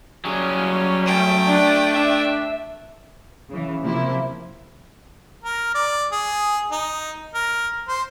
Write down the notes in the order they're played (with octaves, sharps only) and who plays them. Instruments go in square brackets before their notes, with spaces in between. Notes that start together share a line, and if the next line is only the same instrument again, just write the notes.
[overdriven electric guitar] F#3 G#4 [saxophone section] G3 C#4
[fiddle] A3 G5
[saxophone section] D4
[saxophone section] D4 [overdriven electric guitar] E5
[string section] C#3 E3
C3 F3 A#3 C4 E4
[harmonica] A#4
D5
G#4
D#4
A#4
C5